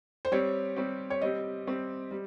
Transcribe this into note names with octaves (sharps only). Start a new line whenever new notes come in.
C5
G3 C4 G4 C#5
G3 C4 G4
C#5
G3 C4 G4 D#5
G3 C4 G4
G3